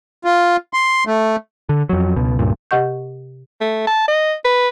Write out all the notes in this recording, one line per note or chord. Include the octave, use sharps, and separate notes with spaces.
F4
C6
A3
D3
F2 F#3
C#2 B2
C#2 G2 A#2
C3 G4 D#5 F#5 C#6 G6
A3
A5
D#5
B4